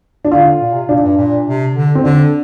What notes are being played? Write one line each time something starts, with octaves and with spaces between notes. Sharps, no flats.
D4
D3 F4
A#2
C3
A#2 D4
G2
A#2
C3
D3
C4
D3 D4